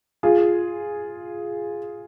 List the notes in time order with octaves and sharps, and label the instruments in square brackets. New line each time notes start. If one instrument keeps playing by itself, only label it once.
[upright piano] F4 G#4